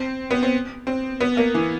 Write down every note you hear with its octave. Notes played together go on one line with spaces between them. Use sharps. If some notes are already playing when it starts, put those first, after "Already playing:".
Already playing: C4
B3
C4
C4
B3
A#3
E3